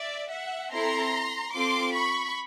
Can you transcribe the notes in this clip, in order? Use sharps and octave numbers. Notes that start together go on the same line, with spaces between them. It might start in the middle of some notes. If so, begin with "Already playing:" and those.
Already playing: D5 E5
E5 F#5
C4 E4 A4 A#5 C6
C4 F4 A4 C6 D6
B5 C#6